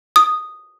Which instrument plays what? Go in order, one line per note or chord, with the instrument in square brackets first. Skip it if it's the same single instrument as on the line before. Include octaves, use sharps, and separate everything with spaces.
[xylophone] D#6